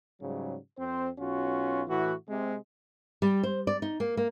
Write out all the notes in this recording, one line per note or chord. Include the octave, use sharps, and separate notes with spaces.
G#2 C#3 F#3 G3
F2 C4 C5
B1 C#4 F4 F#4
A2 E3 F#4
C3 G#3
G3
C5
D5
D#4
A#3
A#3